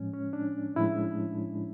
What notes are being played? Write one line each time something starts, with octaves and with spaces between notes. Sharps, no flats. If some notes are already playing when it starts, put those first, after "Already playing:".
Already playing: A2 F3 G#3 C#4
C#4
D4
A2 F3 G#3 E4